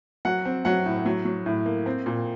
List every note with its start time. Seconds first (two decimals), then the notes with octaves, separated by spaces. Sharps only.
0.25 F#3 F#5
0.45 C4
0.65 F#3 F#5
0.86 A2
1.06 F#3
1.25 F#3
1.46 A2
1.66 A#3
1.86 C4
2.06 A#2